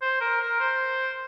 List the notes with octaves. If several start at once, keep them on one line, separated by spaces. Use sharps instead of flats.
C5
A#4
A#4
C5